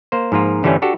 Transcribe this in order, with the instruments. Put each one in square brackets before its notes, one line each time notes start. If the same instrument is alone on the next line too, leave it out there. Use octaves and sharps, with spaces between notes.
[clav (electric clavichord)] A#3 C5
G#2 F3 A#3 F4
G2 D3 E3 G3 A3 C#4
D4 F#4 G4 A4